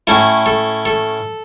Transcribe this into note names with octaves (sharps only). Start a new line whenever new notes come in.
A2 A3 C#4 E4 A4
A4
A4